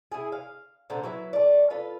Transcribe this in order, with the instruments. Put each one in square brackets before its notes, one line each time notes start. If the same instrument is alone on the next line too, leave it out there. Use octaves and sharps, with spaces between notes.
[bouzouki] E4 G#4
F5
A#2 D3 C5 A#5
F#3 E4 B4
A3 D5
F4 A4 B4